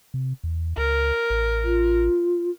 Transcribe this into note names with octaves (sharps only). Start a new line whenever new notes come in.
C3
E2
C#2 A#4
A1
F4